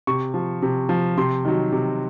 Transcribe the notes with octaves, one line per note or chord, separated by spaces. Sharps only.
C3 C#6
F3
C3
F3
C3 C6
D#3 F#3
C3